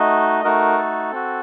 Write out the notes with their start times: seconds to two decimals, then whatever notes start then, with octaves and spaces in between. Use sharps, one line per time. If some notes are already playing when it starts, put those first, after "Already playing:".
Already playing: A3 D#4 F#4 D#5
0.44 A3 D#4 F#4 A#4
0.78 A4
1.12 C4 F#4